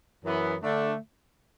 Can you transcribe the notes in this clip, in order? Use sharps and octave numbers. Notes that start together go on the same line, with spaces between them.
F#2 E3 B3
D3 A3 D4